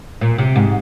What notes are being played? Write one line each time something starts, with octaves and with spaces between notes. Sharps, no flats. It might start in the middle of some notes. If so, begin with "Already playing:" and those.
A#2
C3
G#2